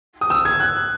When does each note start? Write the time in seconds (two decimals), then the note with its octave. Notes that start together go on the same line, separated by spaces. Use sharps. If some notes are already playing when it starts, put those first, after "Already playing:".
0.21 D#6
0.30 E6
0.45 G#6
0.60 F#6